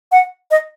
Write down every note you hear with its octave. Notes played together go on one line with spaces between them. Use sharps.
F#5
D#5